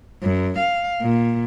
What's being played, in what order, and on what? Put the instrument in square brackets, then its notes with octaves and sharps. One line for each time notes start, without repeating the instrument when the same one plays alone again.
[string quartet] F#2
F5
A#2